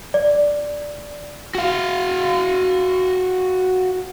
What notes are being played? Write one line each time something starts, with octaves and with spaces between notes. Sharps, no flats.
D5
F#4 F5